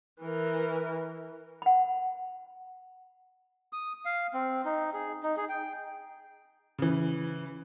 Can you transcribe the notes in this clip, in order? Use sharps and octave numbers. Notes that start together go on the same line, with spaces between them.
E3 A#4
F#5 B5
D#6
F5
C4
D#4
G#4
D#4
G#4
G5
C#3 E3